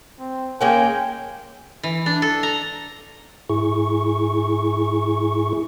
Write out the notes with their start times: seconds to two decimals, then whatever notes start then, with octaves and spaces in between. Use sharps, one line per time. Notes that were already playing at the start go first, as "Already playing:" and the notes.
0.19 C4
0.61 G#3 A#3 C#4 G5 G#5
1.83 E3
2.06 D4
2.22 A4
2.43 A#5
3.49 G#2 E4 G#4 C#6